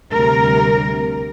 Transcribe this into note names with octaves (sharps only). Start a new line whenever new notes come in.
D2 C3 G3 A#4